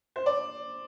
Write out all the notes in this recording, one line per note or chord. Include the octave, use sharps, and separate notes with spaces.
C5
D5